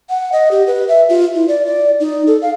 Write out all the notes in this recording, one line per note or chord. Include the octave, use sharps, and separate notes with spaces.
F#5
D#5
G4
B4
E5
F4
E4
D5
D5
D#4
A4
F5